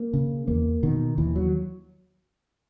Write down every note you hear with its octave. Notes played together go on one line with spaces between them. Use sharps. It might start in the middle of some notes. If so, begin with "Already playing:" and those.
Already playing: A#3
C#3
E2 A#3
B2 D#3
D#2 E3
F#3